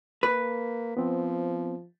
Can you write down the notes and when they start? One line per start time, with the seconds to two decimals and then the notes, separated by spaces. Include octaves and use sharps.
0.23 A#3 B4
0.97 F3 B3 C4